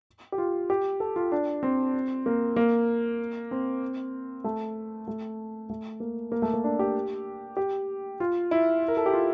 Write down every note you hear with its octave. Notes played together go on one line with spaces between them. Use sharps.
G4
F4
G4
A4
F4
D4
C4
A#3
A#3
C4
A3
A3
A3
A#3
A#3
A3
A#3
D4
G4
G4
F4
E4
A#4
A4
G4
F4